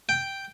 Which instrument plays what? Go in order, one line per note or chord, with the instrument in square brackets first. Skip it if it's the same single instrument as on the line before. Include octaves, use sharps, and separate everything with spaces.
[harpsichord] G5